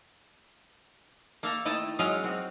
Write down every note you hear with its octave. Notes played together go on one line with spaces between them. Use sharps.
A#3 A4 E5 F5 A#5
D#3 A3 E4 D#5 A5
F#3 G#3 C#4 D#5 F5
C4 F#4